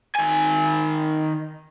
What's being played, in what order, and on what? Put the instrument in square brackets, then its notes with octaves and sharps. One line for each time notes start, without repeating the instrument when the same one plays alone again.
[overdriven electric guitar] D#3 G#5